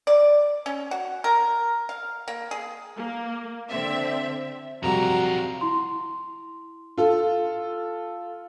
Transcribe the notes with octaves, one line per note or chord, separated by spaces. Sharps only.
D5
C#4
F#4
A#4
F5
A#3
G#4
A#3
D3 C4 E5
F2 C3 F#3 G3 F4 F#4 A#5
E4 C6
F4 A4